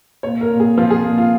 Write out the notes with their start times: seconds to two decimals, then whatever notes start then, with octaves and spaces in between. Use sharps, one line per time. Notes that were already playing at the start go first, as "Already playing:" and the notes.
0.23 A#2 C#5
0.41 A#4
0.50 A#2
0.60 G#4
0.77 F3 F4
0.90 G#4
1.04 A#2
1.18 F4